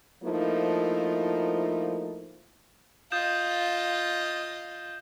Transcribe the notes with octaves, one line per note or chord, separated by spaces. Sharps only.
F3 A3 A#3 D#4 E4
F4 D#5 D#6 G6 E7